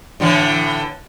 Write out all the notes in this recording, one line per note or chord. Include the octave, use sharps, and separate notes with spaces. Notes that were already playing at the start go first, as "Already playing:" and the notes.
A2 D3 E3